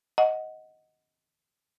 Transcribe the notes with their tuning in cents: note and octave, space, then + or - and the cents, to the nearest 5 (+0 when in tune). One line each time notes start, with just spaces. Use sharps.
D#5 +10 F#5 +0